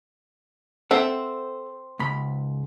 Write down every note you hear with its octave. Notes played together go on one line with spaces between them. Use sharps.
C4 A4 C5 E5 F#5
C#2 G#2 B5